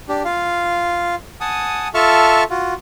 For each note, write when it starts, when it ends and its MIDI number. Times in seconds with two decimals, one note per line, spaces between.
0.09 0.23 62
0.09 0.23 67
0.25 1.15 65
0.25 1.15 77
1.41 1.88 78
1.41 1.88 80
1.41 1.88 81
1.41 1.88 87
1.94 2.44 65
1.94 2.44 69
1.94 2.44 76
1.94 2.44 81
1.94 2.44 85
1.94 2.44 89
2.50 2.74 65
2.50 2.74 66